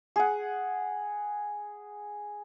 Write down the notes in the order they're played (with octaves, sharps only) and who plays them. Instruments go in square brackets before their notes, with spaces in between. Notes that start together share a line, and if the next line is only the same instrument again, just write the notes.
[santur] G#4 F#5